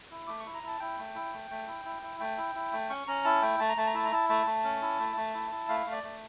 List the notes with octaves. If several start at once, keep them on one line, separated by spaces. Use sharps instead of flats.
E4
A3 D6
C#6
E4
A#5
E4 A5
E4 G5
A3
E4
A3
A3
E4
E4
E4
A3 G5
E4
E4
A3
C#4 C#6
C#4 A#5
E4 A5
A3 G5
A3 A5
A#5
A3 A5
A#5
E4 A5
A#5
E4 A5
A3 A5
A3
C#4
E4
A3
A3
E4
E4
A3 F5
A3
D5
A3